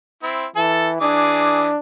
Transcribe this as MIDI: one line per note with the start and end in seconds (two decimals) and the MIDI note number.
0.23 0.46 60
0.23 0.46 64
0.56 0.97 52
0.56 0.89 69
0.56 0.89 81
1.01 1.70 52
1.01 1.79 62
1.01 1.70 68
1.01 1.70 86